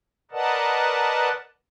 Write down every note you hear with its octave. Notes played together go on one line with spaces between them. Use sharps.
A#4 B4 D5 D#5 F#5 A5